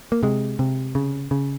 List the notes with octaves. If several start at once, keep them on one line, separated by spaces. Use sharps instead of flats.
A#3
C3 G#3
C3
C#3
C#3